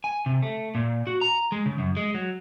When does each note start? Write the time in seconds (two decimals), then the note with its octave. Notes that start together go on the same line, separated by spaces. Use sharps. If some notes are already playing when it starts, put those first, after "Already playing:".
0.04 G#5
0.26 C3
0.43 A3
0.75 A#2
1.07 F#4
1.21 A#5
1.52 G#3
1.66 C#3
1.79 F#2
1.97 G#3
2.14 F#3